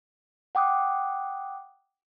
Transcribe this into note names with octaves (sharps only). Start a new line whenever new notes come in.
F#5 G5 D6 D#6 F#6